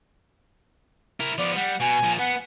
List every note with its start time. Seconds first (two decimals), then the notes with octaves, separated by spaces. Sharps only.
1.20 E4 A#4
1.38 F3 B3 D5
1.56 G3 F#5
1.80 B2 G#5
2.03 A#2 F3
2.19 B3 F#5